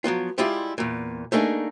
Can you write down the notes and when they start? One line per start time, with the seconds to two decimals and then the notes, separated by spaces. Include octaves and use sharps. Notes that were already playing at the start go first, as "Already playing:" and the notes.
0.04 F3 F#3 B3 F4
0.38 G3 G#3 E4 F4 G4 F5
0.78 E2 A#2
1.32 A3 A#3 D4 D#4 G#4